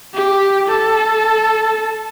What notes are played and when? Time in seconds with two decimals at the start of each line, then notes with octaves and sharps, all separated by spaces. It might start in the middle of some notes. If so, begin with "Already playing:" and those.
0.14 G4
0.68 A4